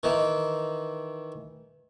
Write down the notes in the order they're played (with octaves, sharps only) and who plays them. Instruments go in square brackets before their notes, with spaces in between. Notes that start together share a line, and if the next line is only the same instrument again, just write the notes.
[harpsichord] D#3 E3